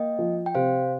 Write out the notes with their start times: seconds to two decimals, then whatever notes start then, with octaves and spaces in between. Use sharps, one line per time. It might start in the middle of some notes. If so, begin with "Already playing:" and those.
Already playing: A#3 D#5 G5
0.19 F3
0.46 G5
0.55 C3 C5 F5